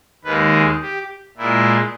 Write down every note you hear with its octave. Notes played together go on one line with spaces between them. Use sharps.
D#2 D#3 G#3 B4
G#4
G4
A#2 G#3 E4